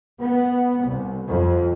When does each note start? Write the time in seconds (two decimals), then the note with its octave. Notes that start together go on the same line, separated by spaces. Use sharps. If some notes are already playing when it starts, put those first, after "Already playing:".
0.20 B3
0.85 C2
1.30 F2